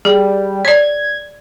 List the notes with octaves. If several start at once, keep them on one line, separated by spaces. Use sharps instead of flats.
G3 G#4
C#5 D5 G#6